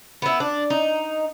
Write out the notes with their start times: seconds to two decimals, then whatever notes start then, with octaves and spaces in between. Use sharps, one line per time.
0.22 B3 E4
0.40 D4
0.70 D#4